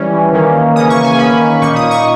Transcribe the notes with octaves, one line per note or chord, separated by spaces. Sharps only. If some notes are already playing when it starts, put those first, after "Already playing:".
Already playing: E3 G3 C#4
D#3 A#3 C#4
C#3 E3 A#3 C#4 D#6
C#6
G#5
D#3 A#3 C#4 B5
A#2 A#3 D#4 C#6
D#6
C#6